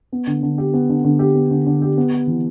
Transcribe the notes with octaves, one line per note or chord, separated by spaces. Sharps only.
B3
D3
D3
G4
B3
D3
D3
G4
B3
D3
D3
G4
B3
G4
E3